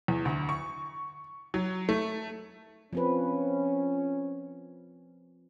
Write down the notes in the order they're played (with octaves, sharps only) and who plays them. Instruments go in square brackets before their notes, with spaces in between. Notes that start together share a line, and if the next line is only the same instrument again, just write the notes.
[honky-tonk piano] E2
D2
C#6
F#3
A3
[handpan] F3 C4 B4 [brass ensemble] C#4